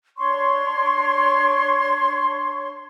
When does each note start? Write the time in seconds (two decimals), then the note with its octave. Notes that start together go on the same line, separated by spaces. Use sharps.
0.18 D4 C#5 C6 C#6